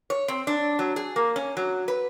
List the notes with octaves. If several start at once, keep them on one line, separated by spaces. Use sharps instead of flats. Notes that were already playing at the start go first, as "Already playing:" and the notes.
C#5
C4
D4
F#3
G#4
A#3
C#4
F#3
B4